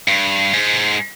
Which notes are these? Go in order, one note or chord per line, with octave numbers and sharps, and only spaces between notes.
G2
G#2